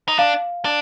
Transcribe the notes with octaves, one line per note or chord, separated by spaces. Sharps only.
D#4
D4 F5
D4